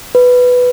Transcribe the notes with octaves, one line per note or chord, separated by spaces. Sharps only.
B4